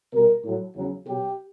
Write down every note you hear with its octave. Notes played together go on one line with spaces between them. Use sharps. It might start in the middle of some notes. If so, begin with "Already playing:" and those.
B2 G3 A#4
A2 F#3
E2 C#3 F#3
B2 F#3 G4